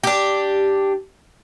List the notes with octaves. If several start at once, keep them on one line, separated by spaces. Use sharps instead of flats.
D4 G4